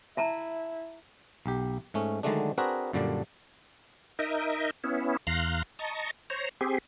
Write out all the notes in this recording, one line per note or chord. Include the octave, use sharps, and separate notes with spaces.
E4 E5 A5 A#5
B1 G4
G#2 A3 C#4
D3 D#3 F#3 G#3 A3 D4
C4 D4 F#4 G#4 A#4 B4
F#2 A#2 D3 G3 D4
D#4 A#4 D#5 E5
B3 C#4 E4
E2 F5 A#5 C6 F#6
D#5 A5 A#5 C#6
C5 C#5 A#5
C4 G4 G#4